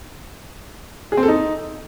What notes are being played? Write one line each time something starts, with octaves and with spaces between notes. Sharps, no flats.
G#4
C4
A4
D#4